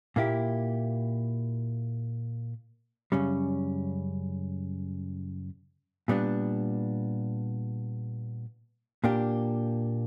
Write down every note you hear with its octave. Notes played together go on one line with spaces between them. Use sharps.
A#2 A#3 E4 G4
F#2 C#3 G3 C#4
A#2 G3 B3 D4
A#2 A#3 D4 G4